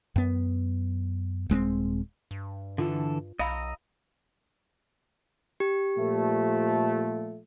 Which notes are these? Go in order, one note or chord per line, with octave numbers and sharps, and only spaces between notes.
F#2 B3
D#1 G#3 B3 C4
G2
D3 E3 F4 A4
B1 D#5 F5 A#5 B5 E6
G4
A#2 F3 A3